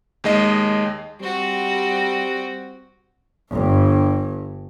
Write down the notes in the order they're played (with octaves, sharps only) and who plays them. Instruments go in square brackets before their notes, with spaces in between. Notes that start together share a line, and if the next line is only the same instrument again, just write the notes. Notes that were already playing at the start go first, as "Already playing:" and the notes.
[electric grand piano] D#2 G#3 D#5
[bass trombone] G3 [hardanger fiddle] C4 F#4
[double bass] G1 G2